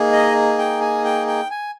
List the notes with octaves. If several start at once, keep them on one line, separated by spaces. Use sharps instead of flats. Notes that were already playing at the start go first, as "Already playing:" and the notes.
Already playing: A#3 D#4 G#4
D#5
G5
G#5
G5
G5
G#5